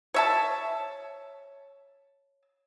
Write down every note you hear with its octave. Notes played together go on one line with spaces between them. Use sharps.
C#5 E5 A5